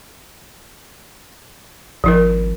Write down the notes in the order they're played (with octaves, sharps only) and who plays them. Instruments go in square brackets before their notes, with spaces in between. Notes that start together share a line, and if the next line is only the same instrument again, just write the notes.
[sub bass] G#1 [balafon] F3 E4 A#4